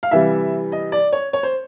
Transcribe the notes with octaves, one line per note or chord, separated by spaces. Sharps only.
F5
C3 E3 G3 E5
D#5
D5
C#5
C#5
C5